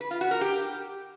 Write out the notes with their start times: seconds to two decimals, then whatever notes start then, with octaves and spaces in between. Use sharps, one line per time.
0.01 B4
0.11 F4
0.21 F#4
0.31 A#4
0.41 G4